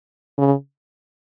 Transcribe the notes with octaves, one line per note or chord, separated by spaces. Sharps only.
C#3